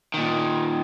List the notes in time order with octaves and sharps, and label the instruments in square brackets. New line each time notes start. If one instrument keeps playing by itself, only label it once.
[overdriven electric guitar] A#2 D#3